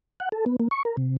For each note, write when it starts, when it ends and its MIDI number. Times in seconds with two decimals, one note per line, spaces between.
0.20 0.29 78
0.32 0.45 69
0.46 0.56 59
0.60 0.68 58
0.71 0.83 85
0.85 0.96 70
0.97 1.17 48